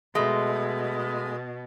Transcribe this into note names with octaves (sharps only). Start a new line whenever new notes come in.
B2 G#3 A3